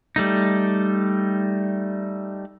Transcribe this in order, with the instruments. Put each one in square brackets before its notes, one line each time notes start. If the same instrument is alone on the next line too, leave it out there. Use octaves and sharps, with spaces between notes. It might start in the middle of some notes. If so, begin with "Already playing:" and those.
[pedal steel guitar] G3 A3 D#4